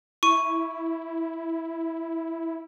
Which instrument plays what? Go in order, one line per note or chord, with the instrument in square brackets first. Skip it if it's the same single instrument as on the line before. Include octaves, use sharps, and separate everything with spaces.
[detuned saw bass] E4 [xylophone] C#6 D#7